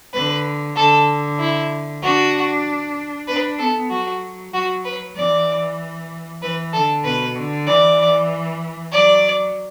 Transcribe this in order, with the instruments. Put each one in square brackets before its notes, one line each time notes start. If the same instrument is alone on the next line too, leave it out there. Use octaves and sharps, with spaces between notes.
[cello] D3 [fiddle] B4
[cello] D3 [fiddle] A4
[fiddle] E4
[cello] D4 [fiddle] F#4
[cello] D4 [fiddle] B4
[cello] B3 [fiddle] A4
[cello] F#3 [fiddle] F#4
[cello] F#3 [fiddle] F#4
[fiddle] B4
[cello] E3 [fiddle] D5
[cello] E3 [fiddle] B4
[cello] D3 [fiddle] A4
[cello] B2 [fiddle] B4
[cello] D3
[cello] E3 [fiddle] D5
[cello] F#3 [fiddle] D5